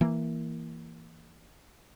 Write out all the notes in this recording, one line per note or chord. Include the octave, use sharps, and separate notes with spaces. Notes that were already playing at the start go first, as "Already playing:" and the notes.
E3 A#3